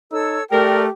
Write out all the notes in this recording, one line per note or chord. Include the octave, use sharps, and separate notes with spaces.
D#4 A4 C#5 E6
A3 G4 A#4 D5 G5